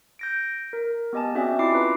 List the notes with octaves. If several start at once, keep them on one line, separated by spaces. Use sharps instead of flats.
G6 A#6 D7
A#4
B3 G4 D#5 G#5 A5
C4 C#4 F#4 G#4 D5 E5
E4 F4 D6 C7
B4 A#5